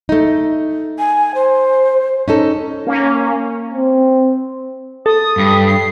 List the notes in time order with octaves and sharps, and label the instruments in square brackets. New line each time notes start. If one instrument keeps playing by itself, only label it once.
[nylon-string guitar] A3 D#4
[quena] G#5
C5
[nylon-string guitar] C#4 D#4 A4
[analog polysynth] A#3 C#4
[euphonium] C4
[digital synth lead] A4 [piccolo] D#6
[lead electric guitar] G2
[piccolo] C7